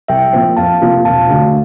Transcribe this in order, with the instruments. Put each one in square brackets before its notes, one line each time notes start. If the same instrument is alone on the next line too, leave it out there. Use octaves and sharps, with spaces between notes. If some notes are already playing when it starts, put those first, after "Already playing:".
[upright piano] C2 [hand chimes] E5 G5
[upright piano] A#2 F3 C4
[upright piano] F2 [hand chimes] F5 A5
[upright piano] C3 F3 A#3 F4
[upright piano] E1 [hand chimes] F5 A5
[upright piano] D2 D3